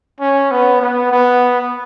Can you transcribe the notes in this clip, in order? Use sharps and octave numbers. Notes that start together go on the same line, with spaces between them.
C#4
B3
B3
B3